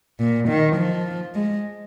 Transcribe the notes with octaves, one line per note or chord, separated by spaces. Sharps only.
A#2
D#3
F3
G#3